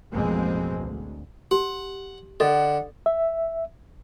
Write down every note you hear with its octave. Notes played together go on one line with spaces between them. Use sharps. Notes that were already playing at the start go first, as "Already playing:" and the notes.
A1 F2 B2 G#3 A#3 C4
D2
G4 F#5
D3 A4 D#5 F#5
E5